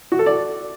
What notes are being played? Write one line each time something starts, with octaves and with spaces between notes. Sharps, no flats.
F#4
A4
D5